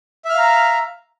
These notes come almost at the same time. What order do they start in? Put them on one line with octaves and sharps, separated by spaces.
E5 F6 F5 A#5